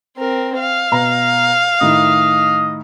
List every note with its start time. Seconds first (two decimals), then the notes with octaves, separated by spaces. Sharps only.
0.17 C4 A#4
0.59 F5
0.92 B2 A#5
1.81 A2 D#3 D#5